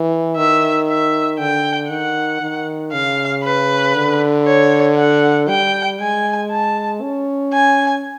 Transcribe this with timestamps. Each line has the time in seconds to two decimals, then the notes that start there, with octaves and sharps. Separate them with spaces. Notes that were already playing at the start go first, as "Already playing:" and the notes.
Already playing: E3
0.36 D#3 E5
0.88 E5
1.39 D3 G5
1.90 D#3 F#5
2.41 D#3
2.92 C#3 F5
3.44 B4
3.95 D3
4.46 C#5
4.98 F#5
5.48 G3 G5
6.00 G#3 G#5
6.50 A5
7.02 C#4
7.53 G#5